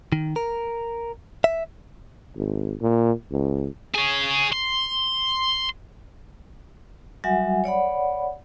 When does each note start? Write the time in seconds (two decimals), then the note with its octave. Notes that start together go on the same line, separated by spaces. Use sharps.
0.12 D#3
0.36 A#4
1.44 E5
2.36 G#1
2.81 A#2
3.32 C#2
3.94 G#4 C#5
4.53 C6
7.24 F#3 G3 F#4 E5 F#5 G#5
7.64 C#5 D5 F#5 B5